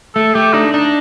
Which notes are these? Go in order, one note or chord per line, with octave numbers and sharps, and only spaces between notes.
A3 A4
A3 G4
D4 D#4
D4 D#4